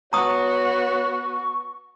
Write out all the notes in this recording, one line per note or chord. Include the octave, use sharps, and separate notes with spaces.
B3 F#4 C#5 A#5 C#6 D#6